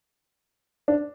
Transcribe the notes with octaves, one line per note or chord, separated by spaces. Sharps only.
D4